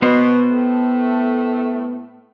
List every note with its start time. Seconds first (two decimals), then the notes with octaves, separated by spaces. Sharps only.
0.02 B2 B3 C5
0.51 A2 A3